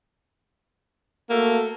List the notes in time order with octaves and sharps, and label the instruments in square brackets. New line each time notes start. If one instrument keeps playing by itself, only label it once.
[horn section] A3 F#4 A4 [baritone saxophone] A#3